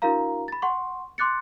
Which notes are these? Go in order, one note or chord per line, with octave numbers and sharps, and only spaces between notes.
D4 E4 F#4 A#4 F5 A#5
B5 A6
F#5 C6 C#6
C6 D6 F#6 A6 C#7